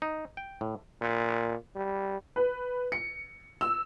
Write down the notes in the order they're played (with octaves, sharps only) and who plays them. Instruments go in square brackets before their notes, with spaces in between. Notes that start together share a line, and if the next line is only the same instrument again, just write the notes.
[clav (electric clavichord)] D#4
G5
A2
[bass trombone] A#2
G3
[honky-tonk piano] B4
C#7
E6